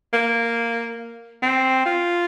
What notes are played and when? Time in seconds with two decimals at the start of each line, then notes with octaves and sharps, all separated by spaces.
0.13 A#3
1.42 C4
1.86 F4